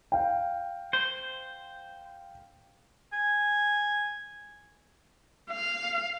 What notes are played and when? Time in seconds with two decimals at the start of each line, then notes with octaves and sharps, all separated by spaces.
0.12 F5 G5
0.93 C5
3.13 G#5
5.51 F5